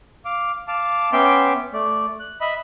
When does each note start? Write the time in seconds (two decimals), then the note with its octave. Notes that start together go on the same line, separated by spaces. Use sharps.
0.25 F5 D6
0.68 F5 A5 D6
1.13 B3 C#4 E5 G5 C6 D6
1.73 A3 D5
2.20 F#6
2.41 D#5 E5 B5